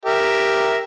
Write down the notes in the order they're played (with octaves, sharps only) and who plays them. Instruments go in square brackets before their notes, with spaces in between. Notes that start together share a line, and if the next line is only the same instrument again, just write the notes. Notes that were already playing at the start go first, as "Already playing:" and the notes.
[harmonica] G4 A#4 E5